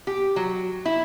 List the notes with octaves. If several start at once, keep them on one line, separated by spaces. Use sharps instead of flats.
G4
F#3
E4